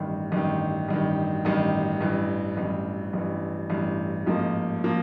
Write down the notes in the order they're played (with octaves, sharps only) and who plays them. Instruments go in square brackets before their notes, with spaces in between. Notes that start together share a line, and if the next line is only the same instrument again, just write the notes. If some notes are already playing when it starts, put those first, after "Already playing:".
Already playing: [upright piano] A1 G2 D#3
A1 G2 D#3
A1 G2 D#3
A1 G2 D#3
A1 G2 E3
A1 G2 E3
A1 G2 E3
A1 G2 E3
A1 G#2 F3 A#3
F3 A#3